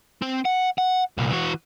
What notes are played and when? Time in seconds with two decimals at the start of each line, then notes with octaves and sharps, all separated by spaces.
0.22 C4
0.45 F#5
0.78 F#5
1.18 C2 A#2
1.31 E3 F#4